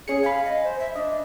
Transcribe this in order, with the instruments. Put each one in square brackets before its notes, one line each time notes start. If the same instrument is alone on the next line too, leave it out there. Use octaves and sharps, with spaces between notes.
[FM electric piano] C#4 C#7 [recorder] G#4
[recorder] F5 [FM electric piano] G#5 B5
[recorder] D#5
C5
E5
[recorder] D4 [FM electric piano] D#5